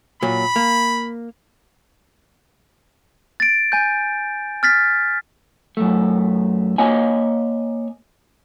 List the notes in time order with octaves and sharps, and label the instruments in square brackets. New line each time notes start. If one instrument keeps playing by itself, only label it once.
[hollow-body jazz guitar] A#2 F#3 [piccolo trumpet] B5
[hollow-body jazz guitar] A#3
[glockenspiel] A6 D7
G#5 G6
F6 A6 B6
[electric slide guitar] F#2 A3
A#3 C#5 D#5 G#5